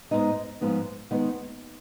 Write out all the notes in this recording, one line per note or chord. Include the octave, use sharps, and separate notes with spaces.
G#2 F3 G#3 B3 D#4 D#5
G#2 F3 G#3 B3 D#4
D#3 G#3 B3 D#4 F#5